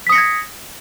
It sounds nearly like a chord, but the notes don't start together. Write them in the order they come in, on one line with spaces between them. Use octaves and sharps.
B6 D#6 C#7 A#6 G#6